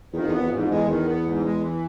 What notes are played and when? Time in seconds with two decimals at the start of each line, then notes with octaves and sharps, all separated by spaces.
0.13 E2 D#3
0.20 F2
0.28 E2
0.31 F2 B3
0.42 E2
0.49 F2 G#2
0.57 E2
0.64 F2
0.69 E2 G#3
0.87 E2 D#3
1.06 B3
1.24 G#2
1.43 G#3
1.61 E3